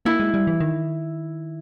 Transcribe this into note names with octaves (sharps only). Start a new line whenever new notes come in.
A#3 E4
G#3
G3
E3
D#3